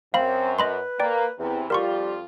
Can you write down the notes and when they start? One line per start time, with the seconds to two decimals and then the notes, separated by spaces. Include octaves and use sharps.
0.14 F#2 C4 F5 B5
0.59 B4 D#5 B5 C6
1.00 A#3 D5 G5
1.39 E2 C3 E3
1.70 F2 G3 F4 A#4 C6 C#6